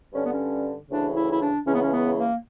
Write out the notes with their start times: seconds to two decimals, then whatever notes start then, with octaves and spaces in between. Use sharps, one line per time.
0.13 G2 D3 C#4
0.23 B3
0.33 C#4
0.89 D2 C#3 E3 D4
1.15 E4
1.32 E4
1.40 D4
1.65 C#2 C#3 E3 C#4
1.73 B3
1.80 C#4
1.91 B3
2.16 A#3